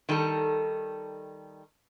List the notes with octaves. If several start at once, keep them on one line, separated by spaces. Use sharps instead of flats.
D#3 G3 D#4 A4